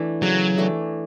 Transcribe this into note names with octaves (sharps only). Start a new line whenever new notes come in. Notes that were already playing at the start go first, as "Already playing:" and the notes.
Already playing: E3 A3 D4
C#3 F#3
E3 A3 D4